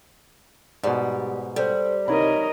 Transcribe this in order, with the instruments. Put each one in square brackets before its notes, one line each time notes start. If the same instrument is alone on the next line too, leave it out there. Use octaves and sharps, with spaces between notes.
[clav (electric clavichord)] G#2 B2 [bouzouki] G3
[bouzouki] G3 [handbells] A4 C5
[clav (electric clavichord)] C2 [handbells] D#4 C#5 B5 [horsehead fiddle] A#4 D#5